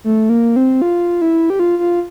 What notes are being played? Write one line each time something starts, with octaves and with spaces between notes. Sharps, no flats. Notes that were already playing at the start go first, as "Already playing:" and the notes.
A3
A#3
C4
F4
E4
G4
F4
F4